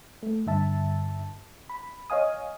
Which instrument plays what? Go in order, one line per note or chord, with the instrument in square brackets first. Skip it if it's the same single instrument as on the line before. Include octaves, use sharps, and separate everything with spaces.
[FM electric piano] A3
G2 D3 E5 A5
B5
C#5 D#5 F5 G#5 D#6